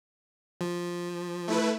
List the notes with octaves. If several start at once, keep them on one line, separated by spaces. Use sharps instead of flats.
F3
A3 E4 B4